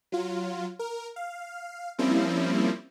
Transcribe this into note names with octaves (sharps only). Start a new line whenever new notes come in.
F#3 F4
A#4
F5
F3 G3 A#3 C4 C#4 E4